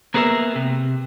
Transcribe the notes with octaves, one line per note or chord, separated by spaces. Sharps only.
A#3 B3 G#4 A#4 C#5 E5
C3